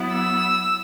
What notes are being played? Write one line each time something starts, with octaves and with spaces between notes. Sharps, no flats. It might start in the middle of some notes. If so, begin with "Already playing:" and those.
Already playing: F#3 B3 E4
E6